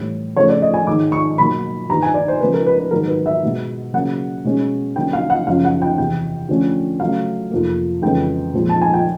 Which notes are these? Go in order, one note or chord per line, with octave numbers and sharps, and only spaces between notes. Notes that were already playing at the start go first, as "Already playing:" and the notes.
Already playing: A2 E3 G3
C#3 F3 A3 C4 C#5
D5
D#5
G#5
G#2 D#3 G#3 D6
C#6
B2 F#3 A#3 B5
G2 D#3 G3 B3 A#5
G#5
D5
C5
C#3 F3 G#3 B3 B4
A#4
B4
B4
G#2 D#3 F#3 B3 A#4
B4
E5
B2 G#3 B3
C#3 F#3 A#3 F#5
B2 G#3 C#4
D3 F#3 A#3 C#4 G5
F5
F#5
F#2 C#3 F3 F5
F#5
G5
E2 C3 E3 G5
D3 F3 A3 C#4
C#3 F#3 A3 C#4 F5
F2 C3 F3 A#3
F2 C#3 E3 G#3 B3 G5
A#2 F3 G#3 C4
A5
G#5
G5